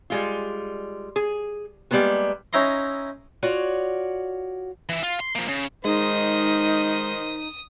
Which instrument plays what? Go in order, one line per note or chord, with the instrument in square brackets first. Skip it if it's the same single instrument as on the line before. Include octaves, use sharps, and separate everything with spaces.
[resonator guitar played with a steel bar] G3 G#3 F4
G#4
G3 G#3 A#3 B3 F#4
[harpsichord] C#4 D#4 E4 A#5 C6
[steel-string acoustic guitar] F4 F#4 C#5 D5
[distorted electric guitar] E3 E4
F4
C6
F3 A#3
C#3
[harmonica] D#3 C5 [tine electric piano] G#3 [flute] D#4 [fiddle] D#6